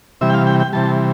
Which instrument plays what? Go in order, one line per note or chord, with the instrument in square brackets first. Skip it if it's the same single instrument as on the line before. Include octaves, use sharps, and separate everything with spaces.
[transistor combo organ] C3 E3 G3 E5
G5
F5
G5
G5
C3 E3 G3 A5